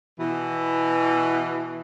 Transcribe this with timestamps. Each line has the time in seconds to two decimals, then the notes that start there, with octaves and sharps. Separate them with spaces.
0.19 B2 E3